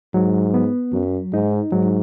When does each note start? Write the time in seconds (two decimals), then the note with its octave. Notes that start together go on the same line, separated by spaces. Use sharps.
0.14 G#2 F#3
0.54 B3
0.93 F#2 F#3
1.33 G#2 D#4
1.72 G#2 F#3